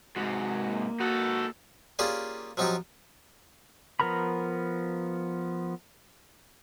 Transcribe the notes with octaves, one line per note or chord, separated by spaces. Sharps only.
G#2 C3 F#4
A#3
D#4 F#4 A4
A#3 C#4 F4 G4 G#4 D5
F3 F#3 C4 D#4 F4 G4
F3 B3 A#4 A#5 B5